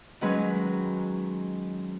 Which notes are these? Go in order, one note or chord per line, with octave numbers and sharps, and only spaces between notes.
D#3 F#3 G#3 C#4 B4